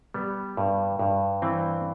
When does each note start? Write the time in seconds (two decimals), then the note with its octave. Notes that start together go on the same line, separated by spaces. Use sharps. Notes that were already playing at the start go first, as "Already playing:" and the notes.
0.14 G3 B3
0.57 G2
0.99 G2
1.42 E3 C4